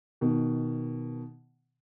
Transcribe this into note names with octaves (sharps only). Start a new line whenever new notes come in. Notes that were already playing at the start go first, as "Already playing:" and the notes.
B2 D#3